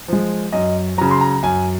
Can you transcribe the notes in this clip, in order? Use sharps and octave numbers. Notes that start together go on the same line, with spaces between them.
F3 G#3
F#2 D#5
C#3 F#3 A#5
C6
A#5
F#2 G#5